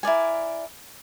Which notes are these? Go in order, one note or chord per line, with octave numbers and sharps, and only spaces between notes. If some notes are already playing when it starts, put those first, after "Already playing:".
E4 A#4 D5 G#5